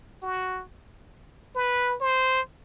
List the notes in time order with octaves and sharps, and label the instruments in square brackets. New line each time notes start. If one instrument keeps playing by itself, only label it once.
[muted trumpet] F#4
B4
C5